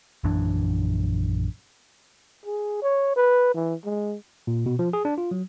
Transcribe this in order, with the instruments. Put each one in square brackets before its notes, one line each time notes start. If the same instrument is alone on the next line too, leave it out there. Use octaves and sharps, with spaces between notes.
[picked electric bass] A#1 F#2 E3 D4
[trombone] G#4
C#5
B4
E3
G#3
[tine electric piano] A#2
B2
F3
G#4
D4
F4
F#3